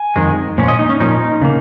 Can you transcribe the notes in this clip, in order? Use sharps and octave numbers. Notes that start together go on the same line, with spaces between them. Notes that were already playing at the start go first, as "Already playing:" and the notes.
Already playing: G#5
F2 D#3 G#3
A#2 F3 C#4
D#5
D#4
C#4
A#2 F3 C#4 D#4
C#3 A#3